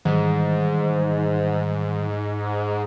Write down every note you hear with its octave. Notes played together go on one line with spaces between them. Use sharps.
G#2 D#3 E3 G3